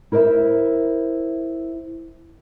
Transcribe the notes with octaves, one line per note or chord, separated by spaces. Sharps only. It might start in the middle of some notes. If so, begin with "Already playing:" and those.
E4 A#4 C5 D5 E5